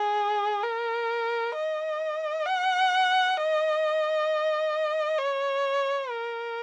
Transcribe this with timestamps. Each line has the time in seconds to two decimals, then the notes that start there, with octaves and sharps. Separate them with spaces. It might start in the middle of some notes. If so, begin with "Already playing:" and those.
Already playing: G#4
0.63 A#4
1.55 D#5
2.46 F#5
3.37 D#5
5.19 C#5
6.10 A#4